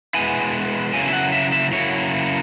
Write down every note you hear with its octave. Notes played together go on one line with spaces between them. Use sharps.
B2 G#3 B3 E4 G#5
C#3 F#3 A#3 E4 G#5
E5
F#5
E5
E5
C#3 F#3 A#3 E4 C#5